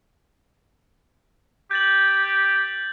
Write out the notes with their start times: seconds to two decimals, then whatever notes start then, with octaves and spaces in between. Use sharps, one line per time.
1.71 G4 G6 A6 F#7